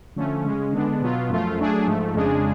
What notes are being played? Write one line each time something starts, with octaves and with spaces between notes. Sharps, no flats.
D3 F3 A3 C#4
C#3 G#3 C#4
D3 G#3 B3 D4
B2 F#3 B3 F4
F#2 F3 A3 F4
F#3 A3 D4 G#4
G#2 F3 A3
F2 C#3 G#3 D4 G#4